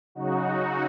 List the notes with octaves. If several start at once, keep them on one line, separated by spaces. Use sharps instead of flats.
C#3 F#3 D#4 F#4